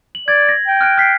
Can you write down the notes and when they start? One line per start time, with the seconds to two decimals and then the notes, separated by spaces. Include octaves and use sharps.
0.15 F#7
0.28 D5 G#6
0.49 A#6
0.68 G5
0.81 F6 F#6 D7
0.98 F6 B6 C7